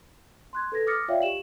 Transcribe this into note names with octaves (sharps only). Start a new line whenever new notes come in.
C6 F#6 G#6
A4 B4 G#6 A#6
D6 D#6 F6 A6 A#6 C#7
F4 C#5 D5 E5 F5 G5
G4 E7 F#7